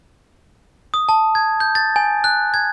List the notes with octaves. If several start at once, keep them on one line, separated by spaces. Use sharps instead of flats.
D#6
A5
G#6
G6
A6
G#5
F#6
G#6